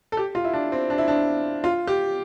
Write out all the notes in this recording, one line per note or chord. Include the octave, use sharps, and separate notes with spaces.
A4
G4
F4
E4
D4
C4
D4
E4
D4
F4
G4